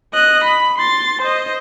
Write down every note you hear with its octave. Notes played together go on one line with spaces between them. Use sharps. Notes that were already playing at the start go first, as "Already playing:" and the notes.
D#5 F#6
B5
C6 A6
C5 D#5